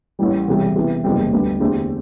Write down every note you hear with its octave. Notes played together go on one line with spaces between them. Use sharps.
A1 A2 E3 G3
E1 E2 C3 G3
C3 E3 B3
F#1 E2 C3 G3 C4
D2 D3 G3 B3
E2 D3 A3 C4 G4